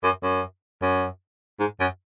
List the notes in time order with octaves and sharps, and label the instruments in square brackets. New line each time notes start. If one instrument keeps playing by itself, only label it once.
[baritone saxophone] F#2
F#2
F#2
G#2
F#2